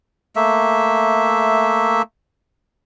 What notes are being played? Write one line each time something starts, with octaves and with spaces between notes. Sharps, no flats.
A3 A#3 E5